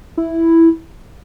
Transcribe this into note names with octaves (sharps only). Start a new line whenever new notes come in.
E4